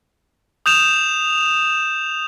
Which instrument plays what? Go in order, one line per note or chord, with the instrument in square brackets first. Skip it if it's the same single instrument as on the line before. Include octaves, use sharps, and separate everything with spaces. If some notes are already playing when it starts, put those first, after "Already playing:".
[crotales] D#6 G6 E7 F7